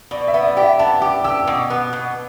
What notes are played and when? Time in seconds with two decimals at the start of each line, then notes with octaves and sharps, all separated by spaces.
0.11 B2 D5
0.28 E5
0.34 B3
0.45 D5
0.57 G4
0.63 E5
0.79 B3 A5
1.02 G4 D6
1.24 G4 E6
1.47 B2 D6
1.70 B3
1.93 B2